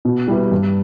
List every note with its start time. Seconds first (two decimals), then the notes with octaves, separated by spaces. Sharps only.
0.05 B2
0.28 G3 E4 B4
0.52 G2